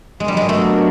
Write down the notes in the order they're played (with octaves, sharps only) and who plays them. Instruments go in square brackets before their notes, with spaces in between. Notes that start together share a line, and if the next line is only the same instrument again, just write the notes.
[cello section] F#3 B3 D4 F#4 A#4 [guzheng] G#3
[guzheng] G3
G#3
A3